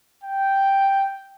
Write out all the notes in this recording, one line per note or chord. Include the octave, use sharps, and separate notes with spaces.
G5